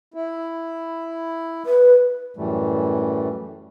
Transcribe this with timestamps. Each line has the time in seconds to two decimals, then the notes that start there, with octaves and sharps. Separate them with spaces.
0.14 E4
1.66 B4
2.37 F#2 A2 E3 G3 A3